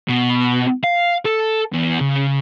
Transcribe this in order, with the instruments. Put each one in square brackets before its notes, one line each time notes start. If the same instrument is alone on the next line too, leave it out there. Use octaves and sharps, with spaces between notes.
[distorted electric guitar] B2
F5
A4
E2
C#3